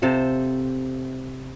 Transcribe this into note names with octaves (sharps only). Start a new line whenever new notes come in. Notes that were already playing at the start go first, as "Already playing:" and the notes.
C3 A4 C5 F5